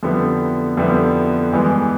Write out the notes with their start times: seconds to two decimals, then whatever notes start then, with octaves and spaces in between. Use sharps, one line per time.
0.03 F2 D3 G3 B3 E4
0.77 F2 D3 G3 B3 E4
1.52 G2 E3 G#3 B3